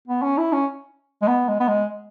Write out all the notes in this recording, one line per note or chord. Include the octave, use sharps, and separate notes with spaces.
B3
C#4
E4
C#4
G#3
B3
G#3
B3
G#3